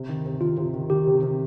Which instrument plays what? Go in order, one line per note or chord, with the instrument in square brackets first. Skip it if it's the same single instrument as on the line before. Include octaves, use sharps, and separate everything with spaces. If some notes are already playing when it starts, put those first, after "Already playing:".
Already playing: [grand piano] C3
D#3
C3
[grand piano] D#3 [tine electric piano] F4
[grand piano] C3
D#3
[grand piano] D#3 [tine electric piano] G4
[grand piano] C3
C3